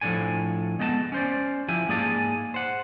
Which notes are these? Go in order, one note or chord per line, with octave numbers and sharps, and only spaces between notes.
A2 F3 G#3 D4 A4 G#5
G#3 B3 D#5 G5 A5
C#4 C5 D5
F3 E4 G4 G#5
G#2 A#3 G#4 D5 G#5 A5
C5 F#5